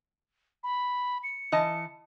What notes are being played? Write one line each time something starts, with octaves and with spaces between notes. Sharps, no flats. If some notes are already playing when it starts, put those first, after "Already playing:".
B5
C#7
E3 D#5 A5